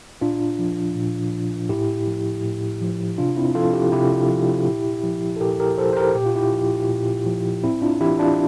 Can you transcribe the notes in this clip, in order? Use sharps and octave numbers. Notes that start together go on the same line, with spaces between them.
A#2 D4 F4
F3
A#2
F3
A2 E4 G4
F3
A2
F3
C3 D4 F4
C4 E4
F3 F4 A4
E4 G4
C3 E4 G4
F3
A#2
F3
A4
A#2 G4 A#4
G4 A#4
F3 A4 C5
C5
G4 A#4
A#2 G4
F4
E4 G4
F3
A#2
F3
A2 C4 E4
D4 F4
E3 E4 G4
D4 F4